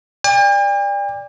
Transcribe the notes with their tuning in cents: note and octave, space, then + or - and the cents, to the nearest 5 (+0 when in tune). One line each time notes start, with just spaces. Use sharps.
D5 +0 G5 +45